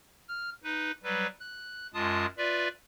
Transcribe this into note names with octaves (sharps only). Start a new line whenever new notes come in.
F6
D#4 B4
F#3 G3 B4
F#6
F#2 G#3 F4 A5 D#6
F4 B4 D5 E5